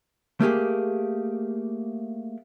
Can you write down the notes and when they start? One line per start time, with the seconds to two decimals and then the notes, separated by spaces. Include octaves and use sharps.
0.40 A3 A#3 G4 G#4